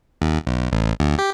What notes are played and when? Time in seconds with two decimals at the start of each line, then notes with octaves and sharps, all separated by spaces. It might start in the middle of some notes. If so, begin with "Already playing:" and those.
0.21 D#2
0.47 B1
0.72 A1
1.00 D2
1.19 G4